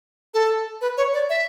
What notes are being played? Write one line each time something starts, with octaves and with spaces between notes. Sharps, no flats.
A4
B4
C#5
D5
E5